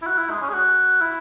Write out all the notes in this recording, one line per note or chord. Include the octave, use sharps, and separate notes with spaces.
E4
F#4
E4
G#3
C#4
G#4
F#4
E4